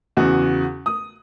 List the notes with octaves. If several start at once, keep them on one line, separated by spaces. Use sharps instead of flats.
E2 C#3 F#4
D#6